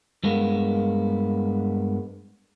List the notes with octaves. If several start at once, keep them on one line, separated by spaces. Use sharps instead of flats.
G2 G#3 A#3 B3